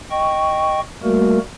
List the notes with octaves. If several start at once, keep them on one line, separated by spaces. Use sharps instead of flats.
D#5 G5 C#6
G3 A3 A#3 F#4 A#4